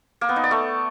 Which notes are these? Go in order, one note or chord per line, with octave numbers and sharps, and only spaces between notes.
A#3
B3
D#4
D5
A3